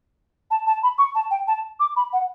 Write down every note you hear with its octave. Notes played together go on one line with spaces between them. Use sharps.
A5
A5
B5
C#6
A5
G5
A5
D6
B5
F#5